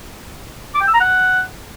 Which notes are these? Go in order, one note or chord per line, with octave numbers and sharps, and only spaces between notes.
D6
G5
E6
A#5
F#5